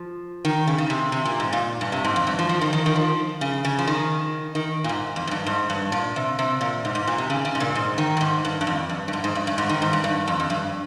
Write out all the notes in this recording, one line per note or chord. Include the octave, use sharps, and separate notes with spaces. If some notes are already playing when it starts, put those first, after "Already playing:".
Already playing: F3
D#3
C#3
C#3
C3
C3
A#2
G#2
A#2
G2
C3
G#2
F2
G2
F3
F3
D#3
D#3
D#3
F3
C#3
C#3
F3
D#3
D#3
A#2
G#2
F2
G#2
G2
G#2
G2
A#2
C3
C3
A#2
G#2
G#2
A#2
C3
C#3
C#3
G#2
A#2
G#2
D#3
G2
G#2
G2
G2
F2
G2
G2
G#2
G#2
G2
G2
G#2
D#3
G#2
G2
G2
F2
F2
G2